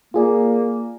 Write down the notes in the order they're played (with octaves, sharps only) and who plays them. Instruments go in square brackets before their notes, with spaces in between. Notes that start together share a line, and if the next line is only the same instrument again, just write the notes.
[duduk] A#3 [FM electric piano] F4 G#4 D5